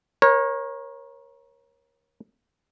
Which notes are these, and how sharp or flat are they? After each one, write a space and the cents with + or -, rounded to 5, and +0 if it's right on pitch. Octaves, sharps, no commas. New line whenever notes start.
A#4 +25 C#5 -25